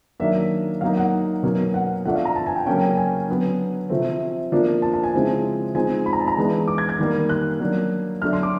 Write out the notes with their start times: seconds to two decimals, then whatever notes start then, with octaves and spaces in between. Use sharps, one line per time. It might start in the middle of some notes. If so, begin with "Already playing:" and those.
0.20 D#3 F#3 A#3 D4 E5
0.81 F#3 A#3 D#4 F5
0.97 F#5
1.43 B2 F#3 A#3 C#4
1.74 F#5
2.05 F3 A3 D4 F#5
2.16 F5
2.25 A#5
2.36 A5
2.46 G#5
2.56 G5
2.66 C#3 F#3 A#3 C#4 G5
2.97 G#5
3.29 D3 F#3 B3
3.90 C3 F3 A3 C4
4.52 F3 A#3 D4
4.82 A5
4.94 A5
5.03 G#5
5.14 C#3 F3 G#3 C4 E4
5.75 F3 G#3 C4 D#4 G#5
6.06 B5
6.13 A#5
6.20 A5
6.28 A#5
6.37 E3 G#3 B3 D4
6.68 D6
6.78 G#6
6.89 G#6
6.98 D#3 G3 A#3
7.29 F#6
7.60 F#3 A#3 D4
8.22 D3 F#3 A3 D4 F6
8.33 C6
8.43 D6